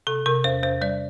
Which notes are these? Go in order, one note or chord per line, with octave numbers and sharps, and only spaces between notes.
C3 A4
C3 A#4
E2 C5
E2 C5
G3 D5